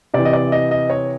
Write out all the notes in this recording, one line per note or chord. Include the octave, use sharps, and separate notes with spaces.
C3 E3 D5
D#5
D5
D#5
D#5
C#5